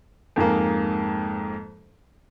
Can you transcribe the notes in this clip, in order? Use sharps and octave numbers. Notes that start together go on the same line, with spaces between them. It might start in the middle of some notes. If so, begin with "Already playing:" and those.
F2 G#2 G#3 A#3